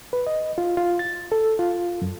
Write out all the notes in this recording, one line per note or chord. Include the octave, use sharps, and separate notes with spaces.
B4
D#5
F4
F4
A6
A4
F4
F#2